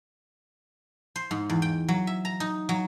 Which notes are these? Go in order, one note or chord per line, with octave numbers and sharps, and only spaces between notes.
C5
G#2
E2
G5
F#3
E5
A#5
D#4
F#3